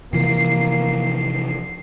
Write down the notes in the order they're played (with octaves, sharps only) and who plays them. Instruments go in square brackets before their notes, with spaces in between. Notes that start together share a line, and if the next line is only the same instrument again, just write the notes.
[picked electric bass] C3 E3 F3 [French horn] A#3 [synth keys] C7